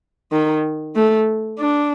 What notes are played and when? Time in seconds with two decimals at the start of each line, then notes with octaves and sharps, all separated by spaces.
0.32 D#3
0.96 A3
1.60 D4